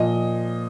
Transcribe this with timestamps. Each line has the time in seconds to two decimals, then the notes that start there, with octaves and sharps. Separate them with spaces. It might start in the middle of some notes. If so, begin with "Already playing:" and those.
Already playing: A#2 F3 D#5